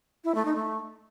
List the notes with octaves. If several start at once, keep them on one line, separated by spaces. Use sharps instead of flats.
E4
A3
D#4
A3